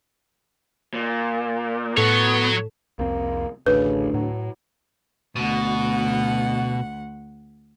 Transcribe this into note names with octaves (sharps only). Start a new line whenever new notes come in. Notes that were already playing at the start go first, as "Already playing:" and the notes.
A#2
A2 F#3 B3 A4 C#5
C2 F2 A#3 C4
A1 D2 C#3 B4
A2 F#3
D2 B2 F#5